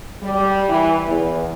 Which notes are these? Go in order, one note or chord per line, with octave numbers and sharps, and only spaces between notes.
G3
E3
E2